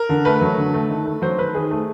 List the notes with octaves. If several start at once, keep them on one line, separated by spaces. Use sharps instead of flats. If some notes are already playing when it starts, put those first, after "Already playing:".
Already playing: A#4
D3
A3 B4
F#3
D3
A3
D#3
A3
F#3 C5
D#3 B4
D#3 G#4
A3